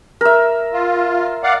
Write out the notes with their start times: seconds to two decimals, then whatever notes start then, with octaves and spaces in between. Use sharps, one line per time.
0.21 A#4 E5
0.73 F4
1.43 D5 F5 F#5